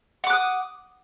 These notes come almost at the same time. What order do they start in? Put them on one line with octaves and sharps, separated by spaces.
F#5 D6 F#6 D#6